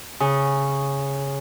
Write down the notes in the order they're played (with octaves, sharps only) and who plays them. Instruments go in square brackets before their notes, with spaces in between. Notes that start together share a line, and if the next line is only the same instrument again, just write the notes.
[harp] C#3